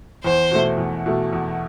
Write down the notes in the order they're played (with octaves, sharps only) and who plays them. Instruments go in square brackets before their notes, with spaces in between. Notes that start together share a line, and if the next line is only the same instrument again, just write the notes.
[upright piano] E2 [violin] C5
[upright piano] B2 A3
E2
B2 A3
E2